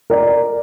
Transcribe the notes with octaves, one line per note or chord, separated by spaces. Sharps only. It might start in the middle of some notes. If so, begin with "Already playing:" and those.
A#4 D5